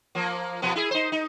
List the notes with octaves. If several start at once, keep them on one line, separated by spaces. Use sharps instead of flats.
F3 A#3
B2 F3 B3
E4 G#4
D#4 C5
D#4